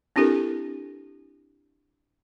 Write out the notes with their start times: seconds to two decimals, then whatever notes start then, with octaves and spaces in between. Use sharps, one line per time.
0.16 C4 D4 E4 G4 A4 A#4